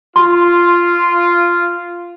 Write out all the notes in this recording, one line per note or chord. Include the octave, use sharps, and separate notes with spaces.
F4 C6